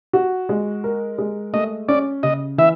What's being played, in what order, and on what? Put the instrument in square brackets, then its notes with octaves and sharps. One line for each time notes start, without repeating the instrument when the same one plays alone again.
[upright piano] F#4
G#3
A#4
G#3
[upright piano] A3 [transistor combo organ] D#5
[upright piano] C#4 [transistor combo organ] D5
[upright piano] C#3 [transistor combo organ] D#5
[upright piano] E3 [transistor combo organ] E5